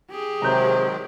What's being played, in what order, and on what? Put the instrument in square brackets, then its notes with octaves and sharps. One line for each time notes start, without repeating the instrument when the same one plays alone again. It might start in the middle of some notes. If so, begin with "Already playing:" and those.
[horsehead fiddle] G4 G#4
[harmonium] C3 [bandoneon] D#3 F#3 G#3 [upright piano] A#5 G6